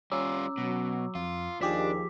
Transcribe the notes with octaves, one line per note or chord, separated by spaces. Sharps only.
G3 C#4 F4 A#5 D6 E6
B2 F#3
F2 F4
D#2 F3 D4 G4 G#4 D6 B6